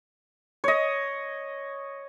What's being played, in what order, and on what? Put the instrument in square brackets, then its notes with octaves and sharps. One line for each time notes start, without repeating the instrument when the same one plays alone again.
[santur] C#5 D#5